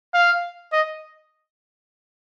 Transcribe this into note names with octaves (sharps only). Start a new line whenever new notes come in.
F5
D#5